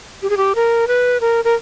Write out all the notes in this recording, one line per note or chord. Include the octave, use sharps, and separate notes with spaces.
G4
G#4
G4
A#4
B4
A#4
A#4